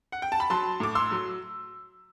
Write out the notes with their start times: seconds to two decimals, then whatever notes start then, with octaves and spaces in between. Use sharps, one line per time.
0.12 F#5
0.22 G5
0.32 A5
0.40 B5
0.50 F#3 A5 C6
0.80 A2 D6
0.95 C6 E6
1.11 F#3